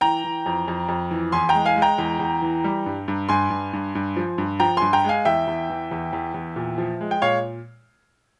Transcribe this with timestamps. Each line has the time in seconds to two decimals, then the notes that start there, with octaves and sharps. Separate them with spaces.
0.01 E3 G5 A#5
0.24 E3
0.46 F2
0.68 F2
0.88 F2
1.11 E3
1.32 E2 G#5 C6
1.49 G5 A#5
1.55 G#3
1.66 F5 G#5
1.76 G#3
1.82 G5 A#5
1.98 E2
2.19 E2
2.42 E3
2.64 G3
2.86 G2
3.08 G2
3.29 G2 G#5 C6
3.50 G2
3.73 G2
3.95 G2
4.17 F3
4.38 G2
4.60 F3 G5 A#5
4.77 G2 G#5 C6
4.93 G5 A#5
5.04 G#3 F5 G#5
5.25 E2 E5 G5
5.47 E2
5.70 E3
5.91 E2
6.13 E2
6.34 E2
6.56 A#2
6.78 F3
7.01 G#3
7.11 G5
7.22 A#2 C#5 F5